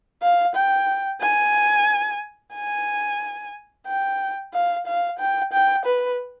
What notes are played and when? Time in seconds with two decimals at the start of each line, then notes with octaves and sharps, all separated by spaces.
0.22 F5
0.55 G5
1.21 G#5
2.55 G#5
3.87 G5
4.54 F5
4.86 F5
5.19 G5
5.53 G5
5.86 B4